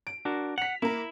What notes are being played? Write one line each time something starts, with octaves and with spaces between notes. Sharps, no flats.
D7
D4 F#4 A#4
F#5 B6 F7
A#3 E4 A#4